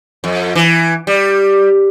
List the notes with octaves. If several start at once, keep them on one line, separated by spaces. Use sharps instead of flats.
F2
E3
G3